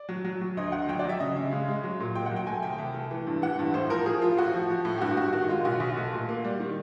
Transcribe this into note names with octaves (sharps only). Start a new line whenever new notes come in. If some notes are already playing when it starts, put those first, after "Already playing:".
Already playing: D5
F#3
F#3
F#3
D2 D#5
D2 F#5
F#3 G5
F#3 D5
E5
C#3 D#5
C#3 E5
G#3 F5
G#3
F#3
A#2
A#2 G5
F#5
F#3
G5
A3 G#5
C2 G5
C2
A3
E3
G2
E3 F#5
G2
A2 C5
F3 A#4
F3 G#4
F3 F4
A2 F#4
F3
F3
A2
G4
G2 F#4
G2 F#4
D#3 F#4
G#3 F4
B1 F#4
B1
A3
A#2
A#3
G3
D#3